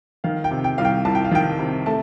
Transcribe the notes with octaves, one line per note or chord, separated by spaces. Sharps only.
D#3 F5
G5
C3
G5
C2 F5
G5
C2 A5
G5
F5
D#3 G5
C3
A3 A5